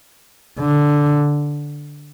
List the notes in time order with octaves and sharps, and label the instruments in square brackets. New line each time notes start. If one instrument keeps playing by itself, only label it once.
[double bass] D3